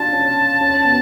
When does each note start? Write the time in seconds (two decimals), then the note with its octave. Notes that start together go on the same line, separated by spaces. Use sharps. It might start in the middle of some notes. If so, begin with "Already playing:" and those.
Already playing: D4 F4 A5
0.12 C#4
0.61 C#4
0.85 B3